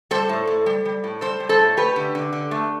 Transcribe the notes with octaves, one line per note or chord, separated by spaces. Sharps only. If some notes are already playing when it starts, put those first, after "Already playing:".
G3 A4 C5
A2
A2
G3
G3
A2
G3 A4 C5
G3
A4 C5
A2
A3 G4 B4
D3
D3
D3
A3